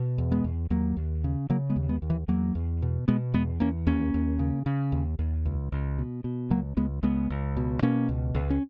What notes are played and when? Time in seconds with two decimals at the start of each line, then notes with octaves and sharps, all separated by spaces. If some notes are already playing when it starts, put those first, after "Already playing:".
Already playing: B2
0.18 E2
0.32 G#3 B3
0.44 E2
0.70 D#2 F#3 A#3
0.97 D#2
1.24 C#3
1.50 C#3 F#3 A#3
1.70 G#3 B3
1.76 D#2
1.89 G#3 B3
2.02 D#2
2.10 E3
2.28 E2 F#3 A#3
2.55 E2
2.82 B2
3.08 B2 G#3 B3
3.34 E2 G#3 B3
3.60 E2 A#3 C#4
3.87 D#2 A#3 C#4
4.14 D#2
4.39 C#3
4.66 C#3
4.92 D#2
5.19 D#2
5.46 C#2
5.72 C#2
5.99 B2
6.24 B2
6.50 C#2 F#3 A#3
6.77 C#2 G#3 B3
7.03 C#2 G#3 B3
7.30 C#2
7.57 B2
7.82 B2 A#3 C#4
8.09 C#2
8.35 C#2
8.50 C#4